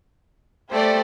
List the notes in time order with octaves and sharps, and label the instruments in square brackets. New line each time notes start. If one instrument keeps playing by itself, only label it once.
[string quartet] A3 [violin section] G4 C5 D5